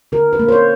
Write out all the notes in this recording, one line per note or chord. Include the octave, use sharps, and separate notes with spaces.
D3 A#4
B4
A#3
C5
C#5